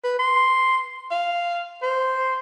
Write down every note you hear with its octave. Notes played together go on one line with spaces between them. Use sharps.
B4
C6
F5
C5